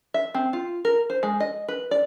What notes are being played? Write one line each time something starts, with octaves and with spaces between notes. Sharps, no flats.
E5
C4
F4
A#4
C5
G#3
D#5
B4
D5